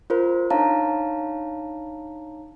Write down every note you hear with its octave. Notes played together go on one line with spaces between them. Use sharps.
F4 A#4 C5
D4 D#4 C#5 F5 A5 A#5